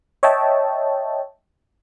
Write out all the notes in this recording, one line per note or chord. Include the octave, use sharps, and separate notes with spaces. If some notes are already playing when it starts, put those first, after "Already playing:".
C#5 D#5 E5 G5 A5